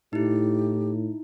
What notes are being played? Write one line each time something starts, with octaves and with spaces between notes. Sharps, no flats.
A2 D#4 E4 G4